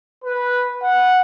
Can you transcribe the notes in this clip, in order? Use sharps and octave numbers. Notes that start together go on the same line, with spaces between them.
B4
F#5